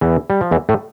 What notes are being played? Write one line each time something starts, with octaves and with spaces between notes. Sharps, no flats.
E2 E3
G3
F3
E2 E3
A2 A3